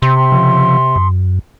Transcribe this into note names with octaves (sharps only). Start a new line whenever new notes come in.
C3 C6
C#3 F3
F#2